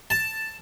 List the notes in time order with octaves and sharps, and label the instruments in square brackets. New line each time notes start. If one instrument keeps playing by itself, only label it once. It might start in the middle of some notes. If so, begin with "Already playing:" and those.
[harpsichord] A5